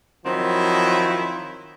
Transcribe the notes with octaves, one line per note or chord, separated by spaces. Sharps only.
D#3 F3 F#3 C4 E4